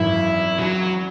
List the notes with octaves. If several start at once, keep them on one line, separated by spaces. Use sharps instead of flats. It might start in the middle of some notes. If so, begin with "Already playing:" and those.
Already playing: G#1 F#2 E3 E4
F#3